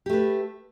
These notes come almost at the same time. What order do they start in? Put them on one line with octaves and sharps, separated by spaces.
G4 A3 B4